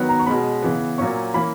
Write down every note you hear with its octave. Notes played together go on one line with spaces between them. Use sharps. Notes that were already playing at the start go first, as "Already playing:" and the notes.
Already playing: D#3 F#3 B3
A#5
C#6
B2 G#3 C#4 B5
C#3 E3 B3
A#2 F#3 C#4 C#6
E3 A#3 C#4 B5